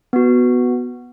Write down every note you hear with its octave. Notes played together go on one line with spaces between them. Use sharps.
B3 F#4